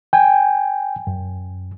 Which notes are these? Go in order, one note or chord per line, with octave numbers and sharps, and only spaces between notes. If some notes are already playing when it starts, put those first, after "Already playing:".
G5 G#5
F#2